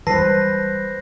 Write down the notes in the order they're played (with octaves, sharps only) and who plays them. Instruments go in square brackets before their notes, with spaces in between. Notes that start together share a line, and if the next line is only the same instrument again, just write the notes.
[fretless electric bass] E3 G3 G#3 [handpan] B4 C5 [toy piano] A5 [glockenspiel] A#6 C7